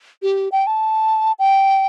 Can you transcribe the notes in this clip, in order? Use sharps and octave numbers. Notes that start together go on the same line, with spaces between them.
G4
G5
A5
G5